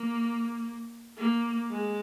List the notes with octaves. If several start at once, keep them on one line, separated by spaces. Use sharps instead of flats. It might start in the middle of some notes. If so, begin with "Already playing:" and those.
Already playing: A#3
A#3
G#3